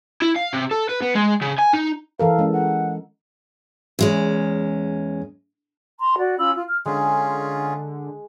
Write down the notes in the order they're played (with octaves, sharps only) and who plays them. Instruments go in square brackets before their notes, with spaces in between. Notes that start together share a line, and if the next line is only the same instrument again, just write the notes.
[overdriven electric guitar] E4
F5
C3
A4
B4
B3
G#3
C#3
G#5
D#4
[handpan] E3 A4 A#4 [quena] F5
[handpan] G#3 C#4
[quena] F#5
[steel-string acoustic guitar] E2 G#3 C#4
[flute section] A#5 C6
F#4 D5
C#4 F4 B5 E6
F4
F6
[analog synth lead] D3 [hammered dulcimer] G#3 [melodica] C#4 F4 G#4